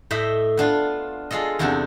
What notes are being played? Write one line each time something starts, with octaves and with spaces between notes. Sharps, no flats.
A2 D#5 E5 G5 B5
B3 D4 F4
G#3 F4 A4 D#5
E2 C3 B3 C4 D4 D#4